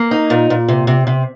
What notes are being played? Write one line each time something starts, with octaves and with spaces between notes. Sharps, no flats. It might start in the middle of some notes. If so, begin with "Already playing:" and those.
Already playing: A#3
D#4
A#2
A#2
C3
C3
C3